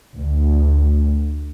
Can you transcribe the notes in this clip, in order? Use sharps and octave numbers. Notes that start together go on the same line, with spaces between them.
D2